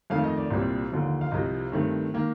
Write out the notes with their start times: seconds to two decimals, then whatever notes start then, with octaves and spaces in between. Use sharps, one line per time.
0.10 F2 D#3 A3 F5
0.24 D#5
0.37 D5
0.51 C2 A#2 G3 C4
0.92 D#2 D3 F3
1.21 F5
1.31 C2 C3 F3 D#5
1.72 G2 D#3 A3 C4
2.14 D#3 A#3